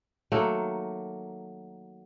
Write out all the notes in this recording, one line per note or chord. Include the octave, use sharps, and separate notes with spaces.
D#3 F#3 A3 A#3